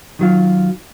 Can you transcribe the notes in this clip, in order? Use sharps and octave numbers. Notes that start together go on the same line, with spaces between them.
D#3 F#3 F4